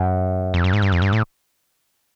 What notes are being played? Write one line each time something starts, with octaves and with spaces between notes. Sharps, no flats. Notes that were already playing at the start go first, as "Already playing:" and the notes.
Already playing: F#2
F2
F#2
G#2
G2
F2
G2
A2